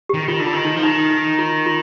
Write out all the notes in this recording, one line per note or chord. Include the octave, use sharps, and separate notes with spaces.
G4
D#3
D#3 F4
D3
F4
D#3
D#4
F3
D#3 D#4
D#4
F4
F4